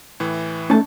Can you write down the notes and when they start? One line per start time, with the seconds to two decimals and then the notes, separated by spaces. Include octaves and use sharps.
0.20 A2 E3
0.70 A3 C#4 D#4 A5